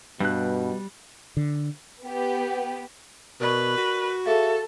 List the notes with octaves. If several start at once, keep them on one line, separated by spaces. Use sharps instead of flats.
G2 B2 G3 F#6
D3
B3 G4
B2 A#4 B4 D5 C#6
F#4
G#4 A4 E5 F5